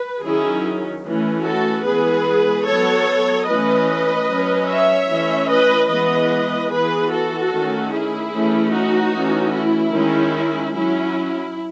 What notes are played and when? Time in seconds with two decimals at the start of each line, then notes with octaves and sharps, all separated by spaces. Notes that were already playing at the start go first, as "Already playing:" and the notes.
Already playing: B4
0.23 D#3 F#3 C#4 E4 G#4
1.04 E3 A3 C#4
1.44 F#4 A4
1.84 E3 G#3 B3 G#4 B4
2.66 F#3 B3 A4 C#5
3.46 E3 A3 C#4 B4 D#5
4.27 F#3 C#4
4.67 C#5 E5
5.08 E3 A3 C#4
5.48 B4 D#5
5.88 E3 G#3 B3 B4 D#5
6.69 E3 B3 G#4 B4
7.09 F#4 A4
7.50 D#3 A3 C#4
7.90 E4 G#4
8.31 E3 A3 C#4
8.71 D#4 F#4
9.11 E3 A3 C#4
9.52 E4
9.92 D#3 G#3 C#4
10.73 F#3 C#4 E4